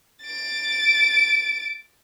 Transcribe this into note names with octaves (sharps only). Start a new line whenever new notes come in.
A6 D7